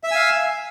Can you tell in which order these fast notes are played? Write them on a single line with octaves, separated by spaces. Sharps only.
E5 E6 G#5 F5